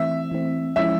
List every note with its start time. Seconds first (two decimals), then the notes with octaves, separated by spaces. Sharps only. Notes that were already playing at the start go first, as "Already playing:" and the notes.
Already playing: E3 A3 C4 E5
0.32 E3 A3 C4
0.76 F3 G#3 C#4 E4 E5